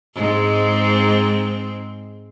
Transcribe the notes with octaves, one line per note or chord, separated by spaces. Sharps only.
G#2 G#3 C4